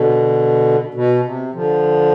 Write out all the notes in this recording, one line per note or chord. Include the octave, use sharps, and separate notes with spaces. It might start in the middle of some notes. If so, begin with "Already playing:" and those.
Already playing: B2 D3
B2
C3
D3 F3